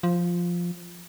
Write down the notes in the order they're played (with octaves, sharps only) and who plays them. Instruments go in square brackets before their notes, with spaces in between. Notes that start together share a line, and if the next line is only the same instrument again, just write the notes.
[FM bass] F3